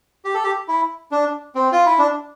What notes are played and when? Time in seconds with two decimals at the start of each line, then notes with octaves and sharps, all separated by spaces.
0.25 G4
0.34 A4
0.44 G4
0.68 E4
1.11 D4
1.55 C4
1.72 F4
1.86 E4
1.99 D4